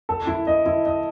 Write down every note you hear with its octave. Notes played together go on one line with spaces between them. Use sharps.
A4
E4
D#5
E4
D#5